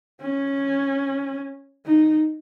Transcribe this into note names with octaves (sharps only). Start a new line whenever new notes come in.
C#4
D#4